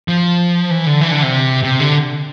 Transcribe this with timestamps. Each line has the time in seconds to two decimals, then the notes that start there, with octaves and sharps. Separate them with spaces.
0.08 F3
0.70 E3
0.86 D3
1.01 E3
1.12 D3
1.22 C3
1.64 C3
1.80 D3